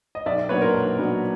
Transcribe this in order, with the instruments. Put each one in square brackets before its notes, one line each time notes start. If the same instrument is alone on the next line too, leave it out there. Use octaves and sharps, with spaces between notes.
[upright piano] D#5
B1 D5 E5
A#2 F#3 B3 D4 B4 C#5
A#4 C5
B1
A#2 F#3 B3 D4